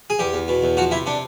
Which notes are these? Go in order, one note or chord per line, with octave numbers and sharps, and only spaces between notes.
G#4
E2 G4
E2
B2
E2
F3 F#4
C3 E4
C3 D4